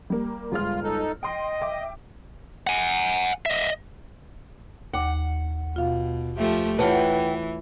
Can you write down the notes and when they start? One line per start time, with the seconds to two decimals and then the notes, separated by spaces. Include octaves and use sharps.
0.10 G3 A#3
0.52 G1 G#3 F4 F6
0.84 D#4 A4
1.23 D#5 G5 C6
1.61 E5 G5 D6
2.67 F#5 G#5
3.46 D#5 E5
4.93 D#2 F#5 D6
5.76 B2 F4 F5
6.37 F3 A3 G4 E5
6.79 E3 F4 B4 C#5 F#5 G5 A5